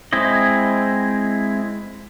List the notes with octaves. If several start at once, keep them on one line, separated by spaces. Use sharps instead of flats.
G#3 C4 E4 D#5